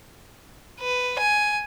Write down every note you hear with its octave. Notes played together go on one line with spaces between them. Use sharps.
B4
G#5